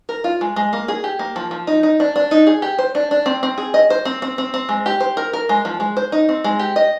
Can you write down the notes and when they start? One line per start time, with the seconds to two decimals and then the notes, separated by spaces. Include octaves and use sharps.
0.09 A#4
0.24 F4
0.41 G#3
0.56 G#3
0.73 A#3
0.88 G#4
1.04 G4
1.19 A#3
1.36 F3
1.51 F3
1.67 D#4
1.83 D#4
2.00 D4
2.16 D4
2.31 D#4
2.47 G#4
2.62 G4
2.79 C5
2.95 D4
3.11 D4
3.26 C4
3.43 C4
3.58 G#4
3.74 D#5
3.90 C5
4.05 C4
4.22 C4
4.38 C4
4.54 C4
4.69 G#3
4.86 G4
5.00 C5
5.17 A#4
5.33 A#4
5.49 G#3
5.65 F3
5.80 G#3
5.97 C5
6.12 D#4
6.29 C4
6.44 G#3
6.60 G4
6.76 D#5